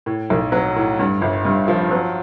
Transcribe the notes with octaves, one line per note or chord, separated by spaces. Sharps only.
A2
B1
F#3
A2
G2
G1
G2
F3
F#3